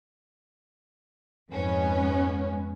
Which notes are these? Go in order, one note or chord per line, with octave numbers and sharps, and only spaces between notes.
F2 G#2 B3 C#4